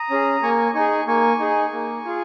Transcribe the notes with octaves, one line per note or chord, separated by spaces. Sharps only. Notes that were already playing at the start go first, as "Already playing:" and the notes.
Already playing: A#5 D#6
C#4 G#4
A#3 G#5 C#6
D#4 G#4 G#5 C#6
A#3 G#5 C#6
D#4 G#4
A#3
F4 G#4